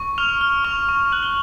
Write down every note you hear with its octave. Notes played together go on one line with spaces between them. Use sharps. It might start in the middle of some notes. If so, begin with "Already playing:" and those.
Already playing: C#6
F6 F7
F6
C#6 F7
C#6
F#6 F#7
G7